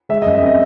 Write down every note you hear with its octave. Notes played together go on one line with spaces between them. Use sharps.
G#3 E5
D#5
F#2
E5
C4 D#5